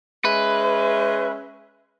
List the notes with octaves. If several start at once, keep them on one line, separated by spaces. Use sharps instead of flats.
G#3 C#4 B4 E5